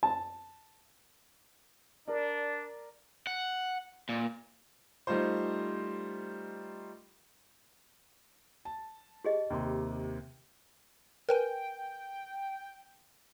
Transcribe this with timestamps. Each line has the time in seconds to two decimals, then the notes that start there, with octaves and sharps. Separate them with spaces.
0.03 A5
2.08 D4 A#4 D5
3.27 F#5
4.09 A#2
5.07 G3 A3 D#4 F4 C5
8.65 A5
9.25 G4 G#4 D#5
9.50 D#2 C3 C6
11.29 A#4 B4 G5 G#5